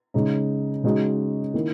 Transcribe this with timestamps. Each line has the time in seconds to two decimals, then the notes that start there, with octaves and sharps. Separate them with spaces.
0.14 C#3 G#3 D#4
0.84 C#3 G#3 D#4 F#4
1.54 D#3 A#3 E4